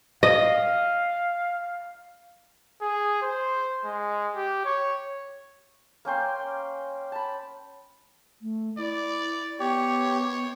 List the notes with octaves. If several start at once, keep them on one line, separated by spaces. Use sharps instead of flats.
D#5 F5
G#4
C5
G#3
G4
C#5
A#3 C#4 G5 C6
A5 B5
A3
E4 D5
B3 G4 C#5